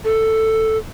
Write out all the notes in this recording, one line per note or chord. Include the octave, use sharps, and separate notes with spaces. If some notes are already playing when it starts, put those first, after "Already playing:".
A4